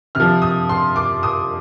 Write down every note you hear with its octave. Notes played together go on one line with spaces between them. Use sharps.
C3 F3 F6
D#6
C6
D6
D#6